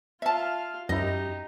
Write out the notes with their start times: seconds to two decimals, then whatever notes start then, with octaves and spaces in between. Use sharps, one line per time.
0.22 F4 E5 F5 A5
0.89 F#2 D#4 E4 G4 D#5